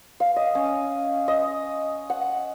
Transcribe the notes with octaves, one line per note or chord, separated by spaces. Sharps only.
F5
D#5
C#4
D#5
F#5